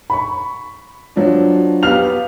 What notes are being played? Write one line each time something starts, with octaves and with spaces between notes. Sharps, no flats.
B5 C#6
F3 F#3 D4
B3 G4 F5 F6 F7